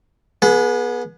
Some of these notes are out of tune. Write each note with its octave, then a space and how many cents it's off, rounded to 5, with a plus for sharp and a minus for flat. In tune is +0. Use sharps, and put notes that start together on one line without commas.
B3 -30 G#4 +25 B5 +35